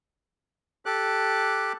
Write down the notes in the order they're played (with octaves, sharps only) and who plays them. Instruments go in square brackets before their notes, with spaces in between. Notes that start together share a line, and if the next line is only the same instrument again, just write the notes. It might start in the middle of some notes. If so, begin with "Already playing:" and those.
[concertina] G4 A4 D6 F#6